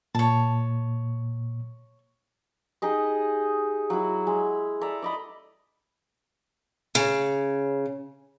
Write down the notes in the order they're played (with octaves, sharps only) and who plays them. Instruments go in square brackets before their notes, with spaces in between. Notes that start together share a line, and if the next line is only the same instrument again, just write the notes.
[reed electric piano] A#2 [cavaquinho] C#5 A5
[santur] D#4 G4 G#4 D#5
F#3 E4
G#3
A4 D5 E5 A#5
D5 D#5 B5
[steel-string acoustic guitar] C#3